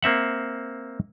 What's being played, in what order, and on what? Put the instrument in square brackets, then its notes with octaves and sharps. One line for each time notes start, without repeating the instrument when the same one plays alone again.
[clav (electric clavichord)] A#3 C4 E5 F#5